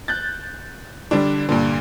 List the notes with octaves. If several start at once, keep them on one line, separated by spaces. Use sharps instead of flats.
F#6 G6 A6
D3 G3 D4
G2 A#2 D3